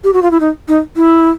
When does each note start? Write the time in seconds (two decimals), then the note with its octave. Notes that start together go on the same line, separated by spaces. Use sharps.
0.04 G4
0.13 F#4
0.22 F4
0.31 E4
0.40 D#4
0.68 D#4
0.96 E4